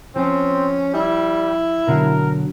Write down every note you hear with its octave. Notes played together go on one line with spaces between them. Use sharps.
F3 C4 C#4
G3 E4
B2 D3 F#3 A#4